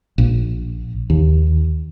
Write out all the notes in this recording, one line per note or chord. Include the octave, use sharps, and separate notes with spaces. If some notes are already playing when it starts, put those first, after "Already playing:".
A#1
D#2